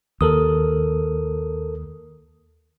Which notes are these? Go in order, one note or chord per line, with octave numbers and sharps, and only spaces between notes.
D#2 A4 A#4 D#6